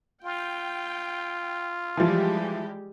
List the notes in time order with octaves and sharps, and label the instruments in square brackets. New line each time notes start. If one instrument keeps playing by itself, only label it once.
[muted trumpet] F4 [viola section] G5
[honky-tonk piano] E3 F3 [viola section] G3 G#3 G4